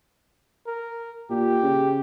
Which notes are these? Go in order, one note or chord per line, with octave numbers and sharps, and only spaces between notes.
A#4
A#2 G4
C#3